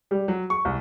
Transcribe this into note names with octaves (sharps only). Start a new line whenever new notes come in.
G3
F#3
C#6
C2